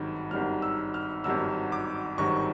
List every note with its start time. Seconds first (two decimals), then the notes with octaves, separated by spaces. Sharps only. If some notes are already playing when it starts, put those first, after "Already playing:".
Already playing: G#1 G2 D#3 F#3
0.31 G#1 G2 D#3 F#3 F6
0.62 E6
0.94 F6
1.24 G#1 G2 D#3 F#3 E6
1.72 D6
2.18 G#1 G2 D#3 F#3 C#6